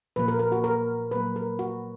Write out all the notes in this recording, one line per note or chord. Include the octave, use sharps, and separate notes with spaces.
A#2 F3 A#3 B4
A#4
A#4
F#4
A#4
A#2 F#3 A#3 B4
A#4
F#4